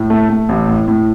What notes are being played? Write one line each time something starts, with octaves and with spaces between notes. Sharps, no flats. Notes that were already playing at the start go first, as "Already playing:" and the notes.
Already playing: A2
A3
A3
A1
A2
A2